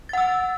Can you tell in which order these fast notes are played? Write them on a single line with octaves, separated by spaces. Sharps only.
A6 F#5 E6